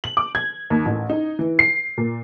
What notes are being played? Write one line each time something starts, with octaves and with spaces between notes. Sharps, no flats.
F#7
D6
G#6
D#2
A1
D#4
E3
C7
A#2